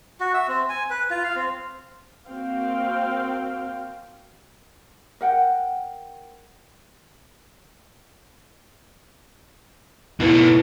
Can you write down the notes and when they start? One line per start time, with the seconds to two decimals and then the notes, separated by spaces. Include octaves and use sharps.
0.20 F#4
0.34 E5
0.48 C4
0.69 G#5
0.90 B4
1.10 F4
1.24 F5
1.36 C4
2.28 A#3 C4 F#4 F5 G5
5.21 A#4 F#5 G5
10.20 B2 A3 D#4 E4 B4